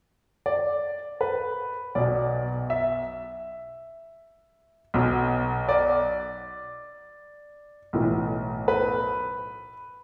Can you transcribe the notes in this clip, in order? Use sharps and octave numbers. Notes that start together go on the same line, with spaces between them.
D5
B4
B1 B2 D5
E5
B1 B2
D5
B1 A2 E3
B4